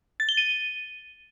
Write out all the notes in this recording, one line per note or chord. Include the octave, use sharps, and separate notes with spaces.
A6
G7
D#7